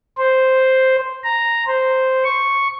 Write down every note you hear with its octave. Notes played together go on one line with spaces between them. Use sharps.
C5
A#5
C5
C#6